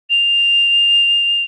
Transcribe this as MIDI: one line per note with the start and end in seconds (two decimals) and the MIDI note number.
0.10 1.43 101